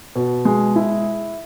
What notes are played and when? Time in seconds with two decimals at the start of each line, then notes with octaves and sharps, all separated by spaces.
0.16 B2
0.45 G#3
0.76 E4